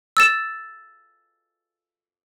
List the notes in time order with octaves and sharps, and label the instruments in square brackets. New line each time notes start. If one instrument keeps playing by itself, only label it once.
[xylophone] E6 A6 E7